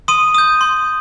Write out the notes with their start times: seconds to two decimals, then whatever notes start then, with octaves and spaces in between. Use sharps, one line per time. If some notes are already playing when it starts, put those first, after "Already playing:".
0.08 C6 D#6 D#7
0.35 D#6 G6
0.61 C6